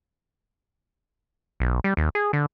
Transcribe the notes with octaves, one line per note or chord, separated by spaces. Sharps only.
B1
G3
D#2
G#4
D3